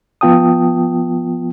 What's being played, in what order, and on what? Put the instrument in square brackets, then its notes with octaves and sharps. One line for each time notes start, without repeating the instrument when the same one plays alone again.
[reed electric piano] F3 B3 F4 G5 A5 D#6